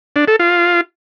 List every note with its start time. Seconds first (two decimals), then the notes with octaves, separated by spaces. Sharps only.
0.16 D4
0.28 A4
0.39 F4